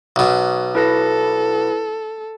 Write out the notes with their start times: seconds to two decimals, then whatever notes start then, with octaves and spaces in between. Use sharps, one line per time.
0.16 B1 B2
0.75 E4 A4 B4 A#6